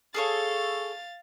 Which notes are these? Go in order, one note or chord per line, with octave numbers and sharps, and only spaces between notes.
G#4 A4 C#5 F5 A6